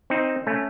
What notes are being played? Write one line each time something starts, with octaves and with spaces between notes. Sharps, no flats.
C4 D#4
A3 C#4